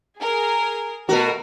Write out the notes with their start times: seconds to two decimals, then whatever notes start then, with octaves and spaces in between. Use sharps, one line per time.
0.20 G#4 A#4
1.09 B2 A3 F#4 A#4